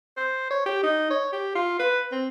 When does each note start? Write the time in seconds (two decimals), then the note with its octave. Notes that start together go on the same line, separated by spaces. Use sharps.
0.17 C5
0.50 C#5
0.66 G4
0.83 D#4
1.10 C#5
1.33 G4
1.55 F4
1.79 B4
2.12 C4